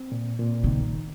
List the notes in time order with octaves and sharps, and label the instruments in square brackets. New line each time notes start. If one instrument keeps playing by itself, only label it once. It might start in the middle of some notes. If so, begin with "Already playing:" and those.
Already playing: [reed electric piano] C4
A#2
A#2
[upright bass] C3
[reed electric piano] D#3